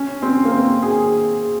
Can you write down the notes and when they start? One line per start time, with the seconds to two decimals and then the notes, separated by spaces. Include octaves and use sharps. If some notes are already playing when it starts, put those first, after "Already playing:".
Already playing: C#4
0.22 C4
0.45 A#3
0.52 C4
0.82 G#4